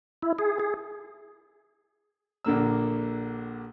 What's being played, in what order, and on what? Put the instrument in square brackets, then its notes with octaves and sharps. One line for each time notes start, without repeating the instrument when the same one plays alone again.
[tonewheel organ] E4
G#4
G#4
[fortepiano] A#1 D3 A#3 E6